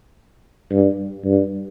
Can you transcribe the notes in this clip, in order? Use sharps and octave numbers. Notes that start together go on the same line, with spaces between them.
G2
G2